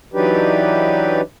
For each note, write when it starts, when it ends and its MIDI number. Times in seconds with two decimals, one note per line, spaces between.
0.14 1.21 52
0.14 1.21 54
0.14 1.21 62
0.14 1.21 63
0.14 1.21 67
0.14 1.21 71